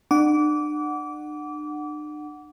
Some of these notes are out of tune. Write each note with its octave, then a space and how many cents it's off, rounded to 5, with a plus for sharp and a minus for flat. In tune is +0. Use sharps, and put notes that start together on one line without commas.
D4 +40 F#5 +0 D6 -25